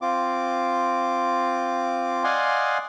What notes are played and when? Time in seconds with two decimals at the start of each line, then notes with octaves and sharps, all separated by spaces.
0.02 C4 F4 D6
2.24 D5 D#5 F5 F#5 G#5 C6